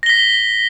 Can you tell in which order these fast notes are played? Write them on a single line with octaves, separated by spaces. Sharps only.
A#6 G7 B6